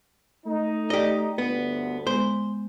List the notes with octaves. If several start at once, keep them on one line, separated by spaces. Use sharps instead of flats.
A3 D#4
G4 D5 D#5
G1 D2 B3
G#3 B3 C5